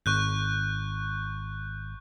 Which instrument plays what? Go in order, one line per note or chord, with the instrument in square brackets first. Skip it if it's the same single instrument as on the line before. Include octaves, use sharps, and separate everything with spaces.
[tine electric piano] G#1 [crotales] C#6 F#6 G6